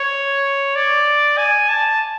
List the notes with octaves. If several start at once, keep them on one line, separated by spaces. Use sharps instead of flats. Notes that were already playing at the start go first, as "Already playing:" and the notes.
Already playing: C#5
D5
G#5
A5